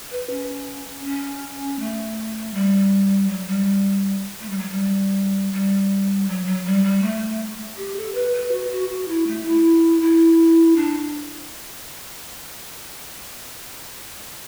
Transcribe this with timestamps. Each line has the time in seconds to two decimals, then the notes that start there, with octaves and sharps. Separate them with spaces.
0.11 B4
0.30 C#4
1.04 C#4
1.79 A3
2.54 G3
3.28 F#3
3.47 G3
4.41 A3
4.49 G3
4.59 F#3
4.69 G3
5.52 G3
6.28 F#3
6.46 F#3
6.65 G3
6.84 G3
7.02 A3
7.77 G4
7.96 A4
8.14 B4
8.33 B4
8.52 F#4
8.71 F#4
8.89 F#4
9.08 E4
9.27 A3
9.45 E4
10.01 E4
10.76 D4